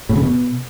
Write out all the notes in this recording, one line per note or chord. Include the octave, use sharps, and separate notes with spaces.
A2
C#3
B2